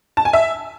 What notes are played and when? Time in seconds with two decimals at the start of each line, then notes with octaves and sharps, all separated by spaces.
0.17 A5
0.25 G#5
0.33 E5